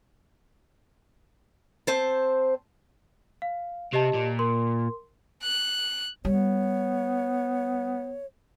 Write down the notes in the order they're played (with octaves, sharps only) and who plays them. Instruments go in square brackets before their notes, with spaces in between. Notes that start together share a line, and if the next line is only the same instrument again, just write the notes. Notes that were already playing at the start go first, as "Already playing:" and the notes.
[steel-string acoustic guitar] C4 C5 A5
[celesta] F5
[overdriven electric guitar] C3 [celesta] G4 D#5 A5
[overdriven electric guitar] A#2
[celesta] A#4 C6
[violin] F#6
[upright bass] G3 [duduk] B3 [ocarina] C#5